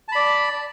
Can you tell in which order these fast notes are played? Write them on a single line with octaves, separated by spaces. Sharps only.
A5 B5 D5